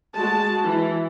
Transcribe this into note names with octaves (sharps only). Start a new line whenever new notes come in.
G#3 F#4 A5
E3